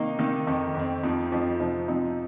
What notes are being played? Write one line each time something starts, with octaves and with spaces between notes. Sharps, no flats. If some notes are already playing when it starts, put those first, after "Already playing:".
Already playing: C3 D#3 A#3 D#4
C3 D#3 A#3 D#4
F2 D#3 C4
F2 D#3 C4
F2 F3 C4 D#4
F2 F3 C4 D#4
C3 F3 C4 D#4
C3 F3 C4 D#4